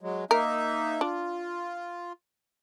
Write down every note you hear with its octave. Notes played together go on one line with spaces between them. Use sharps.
F#3 G#3
A#3 D#4 A#4 E5
D4 F4